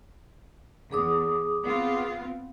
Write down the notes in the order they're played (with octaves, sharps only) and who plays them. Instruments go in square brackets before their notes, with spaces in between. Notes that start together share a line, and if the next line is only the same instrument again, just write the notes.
[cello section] E2 [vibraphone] G#4 D6 D#6
[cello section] B3 C4 F4